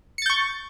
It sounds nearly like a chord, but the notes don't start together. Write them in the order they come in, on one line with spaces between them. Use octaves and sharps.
C#7 A6 G6 C#6